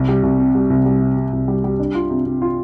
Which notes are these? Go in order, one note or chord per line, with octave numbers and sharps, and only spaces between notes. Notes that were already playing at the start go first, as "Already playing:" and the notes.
Already playing: C2
G3
C2
C3
G3
C2
G3
C3
C3
C2
G3
G3
D4
F4
C3
C3
F4